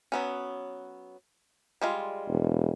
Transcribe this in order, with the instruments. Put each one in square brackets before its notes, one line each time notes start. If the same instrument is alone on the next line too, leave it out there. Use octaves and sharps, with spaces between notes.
[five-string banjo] F#3 B3 C#4
G3 G#3 F4
[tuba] E1